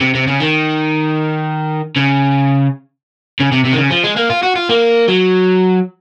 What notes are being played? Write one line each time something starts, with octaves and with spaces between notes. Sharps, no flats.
C3
C3
C#3
D#3
C#3
C#3
C3
C3
D#3
C#3
F3
G#3
A#3
F4
F#4
F4
A#3
F#3